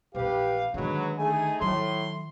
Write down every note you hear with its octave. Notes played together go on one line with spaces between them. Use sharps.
A#1 E2 G4 B4 F5
D3 D#3 F#3 G#3 B4
A3 D#4 G#4 G#5
A2 D#3 F#3 C6